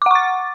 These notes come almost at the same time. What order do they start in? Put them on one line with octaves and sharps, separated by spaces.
D6 F#5 C#6 A6